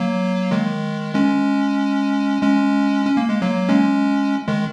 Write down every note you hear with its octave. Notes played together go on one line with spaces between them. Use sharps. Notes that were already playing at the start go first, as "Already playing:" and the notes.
Already playing: F#3 A#3
D#3 G#3
G#3 C#4
G#3 C#4
C#4
A#3
G#3
F#3 A#3
G#3 C#4
D#3 G#3